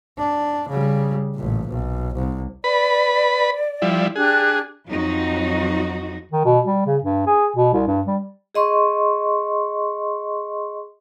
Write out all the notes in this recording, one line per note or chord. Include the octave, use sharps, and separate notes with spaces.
D4
C#3 G3
A1 A#2
B1
C2
B4 D5 B5
F3 G3 E4
D4 G4 G#4 F#6
F2 F#3 D#4 F#4
D#3
B2
G3
C#3
G2
G#4
B2
C2
G2
G3
G#4 D#5 C6 C#6